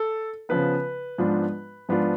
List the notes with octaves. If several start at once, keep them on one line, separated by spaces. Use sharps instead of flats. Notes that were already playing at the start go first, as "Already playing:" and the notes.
Already playing: A4
C#3 F3 B3 B4
G#2 F3 B3 D4 F4
G#2 F3 B3 D4 F4